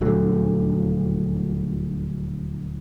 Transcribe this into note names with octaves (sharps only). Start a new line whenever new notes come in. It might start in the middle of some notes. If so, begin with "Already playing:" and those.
D#1 D2 F#3 A3